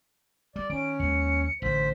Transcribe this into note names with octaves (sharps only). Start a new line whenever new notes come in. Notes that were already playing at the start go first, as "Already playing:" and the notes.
G3 D5
D#3 C#4 D7
D#2 G#3 C#7
A1 D3 C5 B6